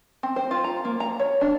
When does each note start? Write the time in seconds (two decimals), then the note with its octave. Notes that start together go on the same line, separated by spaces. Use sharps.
0.23 C4
0.36 C5
0.51 F4
0.64 A#5
0.85 A#3
1.00 A#5
1.19 C#5
1.41 D4